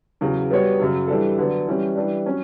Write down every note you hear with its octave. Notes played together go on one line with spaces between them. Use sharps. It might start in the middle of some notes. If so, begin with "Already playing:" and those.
E2 C#3 F#3
G3 B3 F#4 C#5
F#2 C#3 F#3
E3 G3 D4 A4
D3 F#3 B3
E3 G3 C#4
E3 G3 D4
F#3 C#4